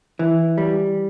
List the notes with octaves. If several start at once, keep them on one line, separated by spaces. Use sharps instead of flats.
E3
G3